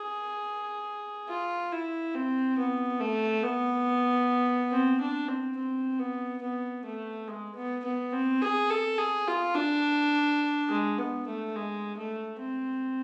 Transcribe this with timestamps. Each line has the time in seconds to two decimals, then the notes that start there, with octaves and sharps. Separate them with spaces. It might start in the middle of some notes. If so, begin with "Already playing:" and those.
Already playing: G#4
1.29 F4
1.72 E4
2.15 C4
2.58 B3
3.00 A3
3.43 B3
4.71 C4
5.00 D4
5.28 C4
5.57 C4
5.99 B3
6.42 B3
6.85 A3
7.27 G#3
7.56 B3
7.84 B3
8.13 C4
8.41 G#4
8.70 A4
8.98 G#4
9.28 F4
9.55 D4
10.69 G#3
10.98 B3
11.27 A3
11.56 G#3
11.98 A3
12.40 C4